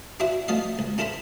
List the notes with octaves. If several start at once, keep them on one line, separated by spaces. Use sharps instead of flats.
D4 E4 F#4 C5 E5 F#5
F3 A3 C#4 D#5 F5
C#2
C#4 E4 A4 A#4 C5 B5